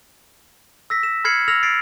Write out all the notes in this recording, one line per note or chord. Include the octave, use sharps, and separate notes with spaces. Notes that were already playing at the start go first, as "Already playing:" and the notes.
E6 A#6 B6
E7
B5 F6 G#6 C7 C#7 F#7
E6 F6 A#6 F7 F#7
A6 C7 D7